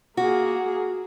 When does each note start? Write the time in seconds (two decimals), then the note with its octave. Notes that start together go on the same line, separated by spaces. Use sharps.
0.17 A#3 F#4 G#4